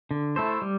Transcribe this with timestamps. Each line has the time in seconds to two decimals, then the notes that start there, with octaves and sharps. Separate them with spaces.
0.11 D3
0.36 A3 E4 A4 C5
0.62 G3